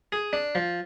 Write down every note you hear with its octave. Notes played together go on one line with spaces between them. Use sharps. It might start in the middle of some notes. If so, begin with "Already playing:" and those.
G#4
D4
F3